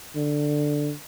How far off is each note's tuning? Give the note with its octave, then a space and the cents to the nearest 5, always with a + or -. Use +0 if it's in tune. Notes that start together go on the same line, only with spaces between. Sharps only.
D3 +5